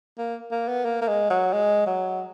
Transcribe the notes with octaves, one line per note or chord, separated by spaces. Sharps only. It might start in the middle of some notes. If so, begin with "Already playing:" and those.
A#3
A#3
B3
A#3
A#3
G#3
F#3
G#3
F#3